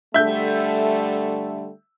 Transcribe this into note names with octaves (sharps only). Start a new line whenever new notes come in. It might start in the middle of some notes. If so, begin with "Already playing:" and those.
D3 G3 A3 E5 G6